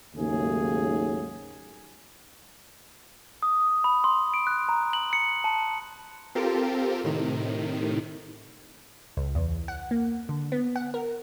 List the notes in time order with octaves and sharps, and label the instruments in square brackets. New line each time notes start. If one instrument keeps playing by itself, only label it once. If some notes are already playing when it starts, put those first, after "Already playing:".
[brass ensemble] D#2 G#2 C#3 F#3 A3 G#4
[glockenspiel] D#6
B5
C6
D7
F#6
A#5
F#7
C#7
A5
[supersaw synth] C4 F4 G4 A4 A#4
A2 C3 D#3
[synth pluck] C#2
E2
F#5
A#3
D3
B3
F#5
A#4